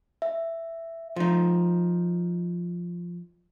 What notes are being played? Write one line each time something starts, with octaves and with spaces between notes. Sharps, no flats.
E5
F3 D#4